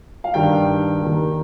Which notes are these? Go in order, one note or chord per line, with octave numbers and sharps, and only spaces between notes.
F5
G2 D#3 G5
D#2 D#3